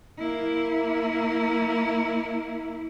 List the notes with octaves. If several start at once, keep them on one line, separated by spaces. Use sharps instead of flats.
A#3 E4